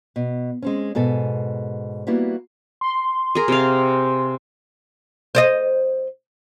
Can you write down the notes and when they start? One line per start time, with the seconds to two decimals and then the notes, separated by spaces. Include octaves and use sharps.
0.16 B2
0.62 G#3 C4 C#4
0.95 G#2 B2 A4 G#5
2.07 G3 A#3 B3 E4 F#4
2.81 C6
3.35 G#4 A#4
3.48 C3 F5
5.35 C5 D5 D#5